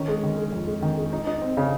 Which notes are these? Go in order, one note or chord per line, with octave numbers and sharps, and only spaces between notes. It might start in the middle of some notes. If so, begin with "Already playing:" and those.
Already playing: D#3 C#4
G#3
D#3
G#3
F2
G#3
D#3
G#3
D#4
D#4
C4
C#3